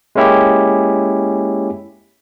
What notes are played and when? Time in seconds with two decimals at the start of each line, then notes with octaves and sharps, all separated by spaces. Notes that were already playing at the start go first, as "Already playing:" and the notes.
0.15 G#3 A#3 C#4 E4 G4